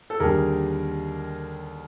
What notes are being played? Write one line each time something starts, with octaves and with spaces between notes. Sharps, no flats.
A4
D#2 D3 G3 G#4 A#4